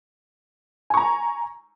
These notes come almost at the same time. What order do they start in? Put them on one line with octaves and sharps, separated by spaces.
G#5 C#6 A#5